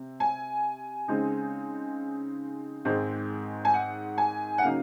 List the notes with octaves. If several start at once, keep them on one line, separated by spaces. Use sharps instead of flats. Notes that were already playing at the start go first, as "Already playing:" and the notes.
Already playing: C3 C4
G#5
C#3 G#3 C4 D#4
G#2 D#3 G#3 C4
G#5
F#5
G#5
F#5
C#3 F#3 A#3 D#4 F5